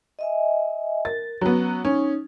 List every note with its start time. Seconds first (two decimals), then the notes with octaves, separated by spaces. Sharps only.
0.19 D#5 E5 G#5
1.05 A#4 A6
1.41 F#3 B3 C#4
1.85 C#4 D#4